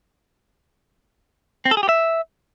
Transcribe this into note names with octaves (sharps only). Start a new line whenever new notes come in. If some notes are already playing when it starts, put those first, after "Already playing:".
C4
A4
G#4
G4
E5